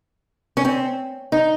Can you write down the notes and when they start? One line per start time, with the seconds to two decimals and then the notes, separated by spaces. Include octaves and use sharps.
0.57 C#4
0.65 C4
1.32 D#4